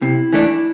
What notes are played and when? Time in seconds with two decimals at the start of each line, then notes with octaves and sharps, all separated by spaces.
0.02 C3 E4
0.33 E3 A3 D4